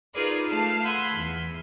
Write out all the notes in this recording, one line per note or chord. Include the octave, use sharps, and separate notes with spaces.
D#4 F4 G#4 A#4 B4 D5
A3 F5 A5
F#5 G#5 B5 C6 E6 F#6
E2